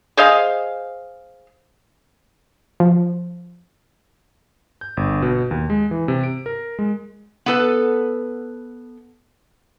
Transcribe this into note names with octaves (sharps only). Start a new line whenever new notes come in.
G#4 C5 D#5 F5
F3
G6
G1
B2
D#2
G#3
E3
C3
D7
A#4
G#3
B3 A4 B4